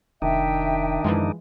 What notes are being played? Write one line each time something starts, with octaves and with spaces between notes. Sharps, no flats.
F1 D#3 D4 D#4 E5 G5
F#2 E3 F3 G#3